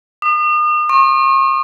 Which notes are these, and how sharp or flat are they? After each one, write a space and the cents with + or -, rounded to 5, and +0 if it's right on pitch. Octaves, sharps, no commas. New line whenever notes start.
D#6 -40
C#6 -40